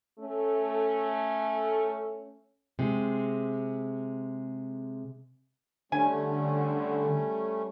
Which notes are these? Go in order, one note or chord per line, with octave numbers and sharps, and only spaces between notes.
A3 C#4
C3 G#3
D3 G3 A3 C#4 G#5